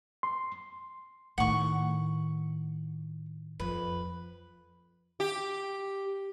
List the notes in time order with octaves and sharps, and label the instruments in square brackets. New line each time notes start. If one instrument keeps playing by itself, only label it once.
[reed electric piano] C6
[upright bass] A2 D#3 [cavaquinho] F#5 C#6
[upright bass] F2 [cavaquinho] B4
[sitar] G4